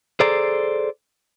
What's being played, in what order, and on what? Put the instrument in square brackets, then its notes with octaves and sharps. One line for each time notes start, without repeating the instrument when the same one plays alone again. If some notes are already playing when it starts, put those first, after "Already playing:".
[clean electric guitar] G#4 A4 C5 D5 A#5